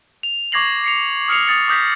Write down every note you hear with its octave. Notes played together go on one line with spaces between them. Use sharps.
F7
C#6 D6 G#6 A#6 C7 F#7
C7 C#7 F7
D#6 F6 C7 C#7 F7
D#6 A6 C#7
D6 D#6 G6 A#6 B6